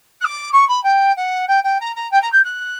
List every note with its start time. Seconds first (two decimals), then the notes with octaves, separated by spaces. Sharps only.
0.20 F#6
0.24 D6
0.52 C#6
0.68 B5
0.83 G5
1.16 F#5
1.48 G5
1.63 G5
1.80 A#5
1.95 A#5
2.11 G5
2.22 A#5
2.32 G6
2.44 F#6